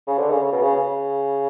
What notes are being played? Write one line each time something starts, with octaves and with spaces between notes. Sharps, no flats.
C#3
D3
C#3
C#3
B2
C#3
C#3